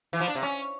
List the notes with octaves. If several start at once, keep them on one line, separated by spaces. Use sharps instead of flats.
E3
F3
D4
C3
C#4